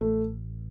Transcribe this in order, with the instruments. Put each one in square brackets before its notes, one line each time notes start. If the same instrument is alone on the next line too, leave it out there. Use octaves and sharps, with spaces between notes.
[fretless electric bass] A1 [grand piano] A3